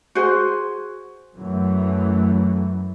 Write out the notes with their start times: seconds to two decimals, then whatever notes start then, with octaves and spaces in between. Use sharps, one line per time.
0.15 F#4 G#4 C5
1.37 F#2 E3 A3